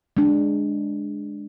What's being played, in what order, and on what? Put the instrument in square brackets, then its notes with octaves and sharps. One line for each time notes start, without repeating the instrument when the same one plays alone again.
[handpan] G#3 D4